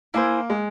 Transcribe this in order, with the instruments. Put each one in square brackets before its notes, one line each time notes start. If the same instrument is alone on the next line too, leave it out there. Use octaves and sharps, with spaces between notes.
[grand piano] A#3 [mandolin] E4 G#4 C5
[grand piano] G#3